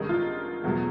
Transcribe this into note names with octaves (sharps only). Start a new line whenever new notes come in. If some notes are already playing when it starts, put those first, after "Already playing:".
Already playing: A1 G2 D#3 G#3 D#4
F4
E2 B2 F#3 A3